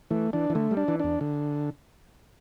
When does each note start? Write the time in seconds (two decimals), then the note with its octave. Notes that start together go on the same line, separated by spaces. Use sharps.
0.11 E3 A3
0.33 E3 D4
0.50 E3
0.55 D3 A3
0.71 G3
0.77 D4
0.88 E3
1.00 E2 D4
1.21 D3